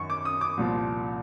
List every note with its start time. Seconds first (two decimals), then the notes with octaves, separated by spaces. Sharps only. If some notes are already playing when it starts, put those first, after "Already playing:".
Already playing: F#2 D#3 C#6
0.10 D6
0.25 D#6
0.41 D6
0.57 C2 A#2 F3